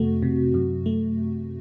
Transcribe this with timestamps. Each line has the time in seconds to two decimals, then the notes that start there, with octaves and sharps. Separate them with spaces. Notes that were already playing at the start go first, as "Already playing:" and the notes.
Already playing: F2 C3 A3 F#4
0.22 C3
0.54 F#2
0.86 A3